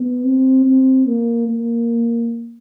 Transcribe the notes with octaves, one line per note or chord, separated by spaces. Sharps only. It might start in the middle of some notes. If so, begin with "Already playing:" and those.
Already playing: B3
C4
C4
A#3
A#3